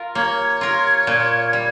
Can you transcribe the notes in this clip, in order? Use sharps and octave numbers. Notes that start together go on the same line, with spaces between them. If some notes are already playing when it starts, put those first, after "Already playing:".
Already playing: F4 A#4
A#3 C#5
F4 A#4
A#2
G3